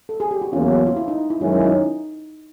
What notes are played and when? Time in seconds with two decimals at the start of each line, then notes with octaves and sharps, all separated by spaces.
0.09 A4
0.20 G#4
0.31 G4
0.42 F#4
0.52 E2 C#3 F#3 A#3 C#4 F4
0.86 F4
0.97 E4
1.08 D#4
1.30 E4
1.41 F#2 D#3 G#3 C#4 E4 F#4
1.63 D#4